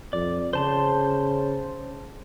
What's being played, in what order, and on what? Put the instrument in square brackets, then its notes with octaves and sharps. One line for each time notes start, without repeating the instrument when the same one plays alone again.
[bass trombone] F2 [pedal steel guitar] D5
[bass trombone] C#3 [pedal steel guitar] C5 A5 C6